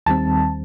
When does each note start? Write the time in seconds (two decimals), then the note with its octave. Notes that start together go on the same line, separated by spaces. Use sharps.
0.06 D#2 D#3 G3 C4 A5